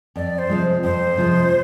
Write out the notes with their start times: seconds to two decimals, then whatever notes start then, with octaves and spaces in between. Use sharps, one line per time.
0.16 F2 D5
0.38 C5
0.50 C3 F3 G#3
0.83 F2 C5
1.17 C3 F3 G#3